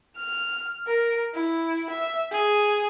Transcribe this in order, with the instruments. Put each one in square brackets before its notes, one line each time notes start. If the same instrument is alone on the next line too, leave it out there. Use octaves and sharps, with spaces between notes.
[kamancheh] F6
A#4
E4
E5
G#4